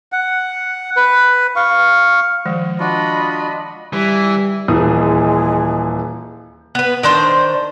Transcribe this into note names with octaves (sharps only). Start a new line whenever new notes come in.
F#5
B4
F5 C#6
D#3 F3 G#3
D4 F4 F#4 D#5 B5
E3 G3
D#1 E3 G#3 D#6
B3 B4
D#3 D4 C5